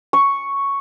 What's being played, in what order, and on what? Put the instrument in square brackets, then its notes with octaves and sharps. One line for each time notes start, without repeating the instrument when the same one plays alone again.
[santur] C#6